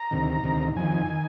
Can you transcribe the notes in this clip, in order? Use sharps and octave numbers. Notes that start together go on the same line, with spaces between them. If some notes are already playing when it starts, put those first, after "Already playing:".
Already playing: A#5
D2 C3 D#3
D2 C3 D#3
F2 D#3 G#5
D#3